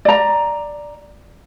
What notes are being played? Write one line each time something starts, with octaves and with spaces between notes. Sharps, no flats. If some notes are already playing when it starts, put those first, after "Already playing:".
D5 A#5